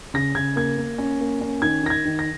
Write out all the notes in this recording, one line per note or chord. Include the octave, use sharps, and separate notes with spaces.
C#3 A#6
C#3 G#6
A#3 G#6
A#3
C#4
A#3
C#4
D#3 G#6
D#3 A#6
G#6
D#3
A#6